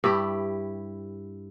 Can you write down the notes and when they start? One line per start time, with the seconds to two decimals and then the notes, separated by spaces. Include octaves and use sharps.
0.04 G2 E4 G4